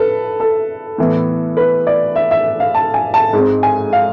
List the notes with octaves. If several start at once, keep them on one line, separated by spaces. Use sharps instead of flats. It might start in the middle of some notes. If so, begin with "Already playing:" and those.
Already playing: A4 B4
A4
A2 E3 B3
B4
D5
E5
E5
F5
A5
G#5
A5
G#2 G#3 C4
G#5
F5